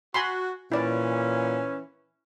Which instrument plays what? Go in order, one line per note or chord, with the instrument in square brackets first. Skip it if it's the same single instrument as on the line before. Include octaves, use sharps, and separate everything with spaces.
[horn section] F#4 [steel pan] G#5 B5 C6
[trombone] A#2 [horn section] E3 C#4 [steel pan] E4 D5